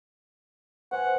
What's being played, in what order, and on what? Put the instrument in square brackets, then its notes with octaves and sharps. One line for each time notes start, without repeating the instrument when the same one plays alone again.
[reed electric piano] B4 C5 G#5 [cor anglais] F#5